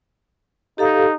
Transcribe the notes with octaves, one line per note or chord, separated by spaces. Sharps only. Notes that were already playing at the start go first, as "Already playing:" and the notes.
D#4 G4 A4 F5